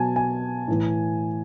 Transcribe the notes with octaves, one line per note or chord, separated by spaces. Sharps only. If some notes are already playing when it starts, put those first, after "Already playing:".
Already playing: B2 F#3 G#5 A5
G#5
A2 E3